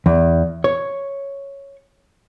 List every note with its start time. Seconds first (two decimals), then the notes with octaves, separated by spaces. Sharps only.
0.06 E2
0.64 C#5